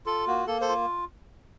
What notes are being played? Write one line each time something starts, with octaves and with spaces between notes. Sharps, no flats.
F4 A4
A#3 F#4
A#3 A4
A4 C5
F4